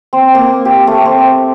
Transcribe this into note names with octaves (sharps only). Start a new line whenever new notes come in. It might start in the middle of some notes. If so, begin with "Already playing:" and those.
C4
A#3
G4
A3
C4